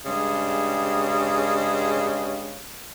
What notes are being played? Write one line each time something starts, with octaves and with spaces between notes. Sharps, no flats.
G2 C#3 G3 G#3